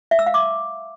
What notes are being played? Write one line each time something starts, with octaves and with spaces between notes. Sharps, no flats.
E5
E6
F5
D6